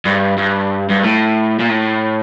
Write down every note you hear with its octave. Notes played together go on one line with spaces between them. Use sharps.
G2
G2
G2
A2
A#2
A2